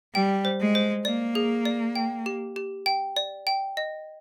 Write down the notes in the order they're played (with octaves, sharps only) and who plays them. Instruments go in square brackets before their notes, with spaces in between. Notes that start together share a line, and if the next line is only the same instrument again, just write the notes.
[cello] G3 [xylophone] G5
[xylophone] C5
[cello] G#3
[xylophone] C5
[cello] A#3 [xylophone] D5
[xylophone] G#4
D5
G5
G4
G4
G5
D5
G5
D#5